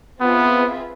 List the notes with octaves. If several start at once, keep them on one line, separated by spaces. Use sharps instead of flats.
B3 C4 F4 G#4 B4 E5